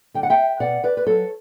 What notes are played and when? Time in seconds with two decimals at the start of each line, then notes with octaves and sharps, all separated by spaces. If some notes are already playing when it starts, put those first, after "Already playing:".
0.14 D3 G3 G5
0.23 F#5
0.30 E5 G5
0.60 B2 D5 F#5
0.84 B4 D5
0.97 B4
1.07 F#3 A4 C#5